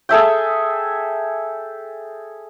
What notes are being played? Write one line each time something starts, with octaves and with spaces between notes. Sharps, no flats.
G#4 A4 E5 G5